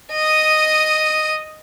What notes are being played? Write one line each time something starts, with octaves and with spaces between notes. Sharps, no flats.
D#5 D#6